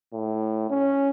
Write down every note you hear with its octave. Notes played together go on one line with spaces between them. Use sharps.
A2
C#4